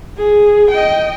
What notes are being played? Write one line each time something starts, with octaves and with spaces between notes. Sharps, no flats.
G#4
D#5 G5